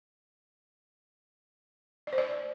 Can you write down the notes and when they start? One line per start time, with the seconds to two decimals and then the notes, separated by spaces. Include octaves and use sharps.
2.07 D5
2.13 C5
2.18 D5